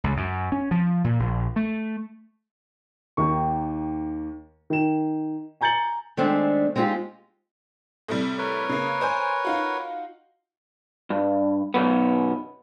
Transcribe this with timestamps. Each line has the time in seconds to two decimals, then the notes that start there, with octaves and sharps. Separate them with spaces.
0.04 C#2
0.17 F#2
0.52 C#4
0.71 F3
1.04 A#2
1.19 A#1
1.56 A3
3.17 D#2 D#3 C#6
4.70 D#3 E7
5.61 G#5 A#5 G6 A6 C#7 F#7
6.17 D#3 G#3 A3 C4 D4
6.76 G#3 C4 D#4 F4 G4
8.08 A2 C3 G3
8.38 A#4 B4 C#5
8.69 C#3 A#3
9.01 C5 G#5 G6
9.45 D#4 F4 F#4
11.10 G2
11.74 B1 F#2 B3